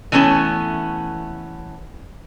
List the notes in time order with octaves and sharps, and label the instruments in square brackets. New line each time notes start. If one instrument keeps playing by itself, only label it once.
[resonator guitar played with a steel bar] E3 A3 B3 C#4 A5